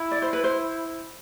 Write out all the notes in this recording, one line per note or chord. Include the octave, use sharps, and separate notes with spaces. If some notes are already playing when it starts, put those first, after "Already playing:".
Already playing: E4
D5
C5
B4
C5